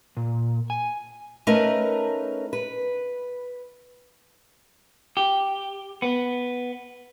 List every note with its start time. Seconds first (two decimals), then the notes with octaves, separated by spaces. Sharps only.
0.17 A#2
0.70 G#5
1.47 A3 C#4 D#4 A#4 B4
2.53 B4
5.17 G4
6.02 B3